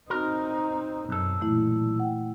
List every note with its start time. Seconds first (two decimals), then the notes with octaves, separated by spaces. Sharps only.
0.10 C4 D#4 F#4 A#4
1.09 B1 F#2 A4
1.40 A#2 E3 A3 E4
2.00 F#5 G5